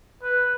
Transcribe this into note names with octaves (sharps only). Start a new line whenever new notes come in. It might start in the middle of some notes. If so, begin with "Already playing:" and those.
B4